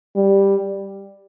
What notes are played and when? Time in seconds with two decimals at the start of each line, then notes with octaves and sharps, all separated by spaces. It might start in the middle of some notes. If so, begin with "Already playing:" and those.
0.16 G3